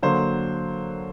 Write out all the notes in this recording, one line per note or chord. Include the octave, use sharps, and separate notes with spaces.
D3 F#3 A#3 C5